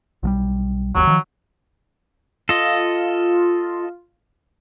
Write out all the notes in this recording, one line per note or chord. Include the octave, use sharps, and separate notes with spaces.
B1 F3 G3
G1 D#2 F#3
D#3 F3
F4 A4 D#5